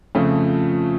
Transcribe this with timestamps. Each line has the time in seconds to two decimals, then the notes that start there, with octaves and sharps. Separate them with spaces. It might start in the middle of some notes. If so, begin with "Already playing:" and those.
0.15 F2 C#3 F3 A3